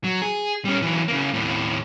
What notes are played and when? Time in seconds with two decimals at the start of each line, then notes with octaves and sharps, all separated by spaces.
0.04 F#3
0.22 G#4
0.65 G3 C#4
0.82 E3 F#3
1.08 C#3 A#3
1.34 D#2 A2